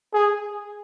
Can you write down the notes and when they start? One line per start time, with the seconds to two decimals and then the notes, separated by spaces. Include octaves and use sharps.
0.14 G#4